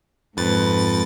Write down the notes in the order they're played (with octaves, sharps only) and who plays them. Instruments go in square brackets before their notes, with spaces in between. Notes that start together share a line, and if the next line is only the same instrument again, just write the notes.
[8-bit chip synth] F2 A6 [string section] G#2 [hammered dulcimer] B4